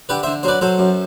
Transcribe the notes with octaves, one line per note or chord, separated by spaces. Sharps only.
D3 G4 B4
D3 C5 E5
F#3 B4 C5 D5
F#3 A4 C5
F#2